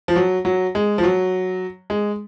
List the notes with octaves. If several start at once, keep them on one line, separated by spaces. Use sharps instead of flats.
F3
F#3
F#3
G#3
F3
F#3
G#3